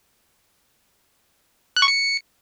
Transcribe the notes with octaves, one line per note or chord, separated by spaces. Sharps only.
F#6
C#6
C#7